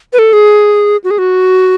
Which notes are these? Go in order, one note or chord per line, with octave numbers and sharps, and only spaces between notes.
B4
A4
G#4
F#4
G#4
F#4